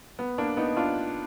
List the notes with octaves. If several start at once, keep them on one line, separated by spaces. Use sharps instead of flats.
B3
A#3 D4
B3 D#4
D4 F4